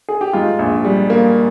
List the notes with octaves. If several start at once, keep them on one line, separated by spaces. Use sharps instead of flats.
G#4
G4
G#2 F4
A#1
G3
A#3